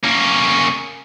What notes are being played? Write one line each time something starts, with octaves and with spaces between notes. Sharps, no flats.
A#3 C#4